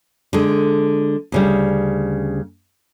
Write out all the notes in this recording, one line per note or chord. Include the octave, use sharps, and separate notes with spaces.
D3 G#3
D2 C#3 G3